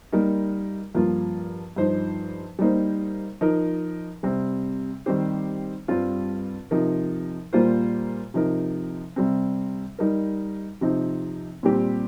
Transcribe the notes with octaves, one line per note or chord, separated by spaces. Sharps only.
G3 A#3 D#4 A#4
G2 F3 A#3 F4
G2 F3 D#4 C5
G3 A#3 D#4 C5
F3 D#4 A#4
C3 G3 C4
D#3 G3 C4 G4 C5
G2 G3 C4 F4
C3 F3 D#4 A#4
A#2 G3 A#3 F4 C5
C3 F3 D#4 A#4
C3 G3 C4
G3 D#4 A#4
C3 F3 C4 D#4
A#2 G3 C4 G4